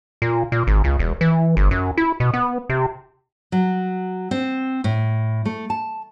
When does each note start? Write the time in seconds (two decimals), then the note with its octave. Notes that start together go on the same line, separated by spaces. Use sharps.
0.22 A#2
0.52 A#2
0.67 G#1
0.84 C#2
0.99 E1
1.21 E3
1.57 G1
1.71 F#2
1.97 E4
2.20 B2
2.34 B3
2.69 C3
3.52 F#3
4.31 C4
4.84 A2
5.45 A3
5.70 A5